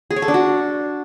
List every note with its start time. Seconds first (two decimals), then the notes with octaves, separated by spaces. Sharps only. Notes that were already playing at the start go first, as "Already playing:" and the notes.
0.11 G#4
0.16 C#5
0.22 A4
0.28 D4
0.34 F#4